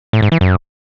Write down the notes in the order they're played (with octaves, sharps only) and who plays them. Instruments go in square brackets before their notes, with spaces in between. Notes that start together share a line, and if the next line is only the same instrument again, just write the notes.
[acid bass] A2
G#2
E3
F#2